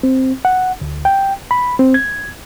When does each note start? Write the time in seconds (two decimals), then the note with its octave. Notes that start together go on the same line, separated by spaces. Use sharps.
0.03 C4
0.45 F#5
0.81 D2
1.05 G5
1.51 B5
1.79 C4
1.94 G#6